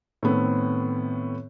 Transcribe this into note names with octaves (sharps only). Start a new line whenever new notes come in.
A2 D#3 A3 B3 C4